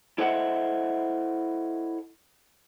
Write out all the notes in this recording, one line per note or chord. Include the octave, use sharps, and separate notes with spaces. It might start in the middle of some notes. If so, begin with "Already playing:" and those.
E4 A4 C5 D#5 E5 F#5